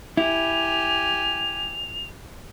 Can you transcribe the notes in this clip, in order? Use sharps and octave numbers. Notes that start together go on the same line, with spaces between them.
E4 G4 G#5 F7